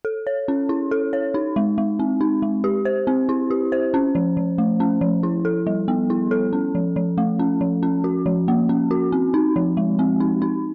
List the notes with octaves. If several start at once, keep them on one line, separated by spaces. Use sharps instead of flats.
A4
C#5
C#4
E4
A4
C#5
D#4
G#3
G#3
C4
D#4
G#3
G4
C5
C4
E4
G4
C5
C#4
F3
F3
A3
C#4
F3
E4
A4
G3
B3
E4
A4
C#4
F3
F3
A3
C#4
F3
C#4
F#4
F3
A#3
C#4
F#4
C4
D#4
F3
G#3
C4
D#4
D#4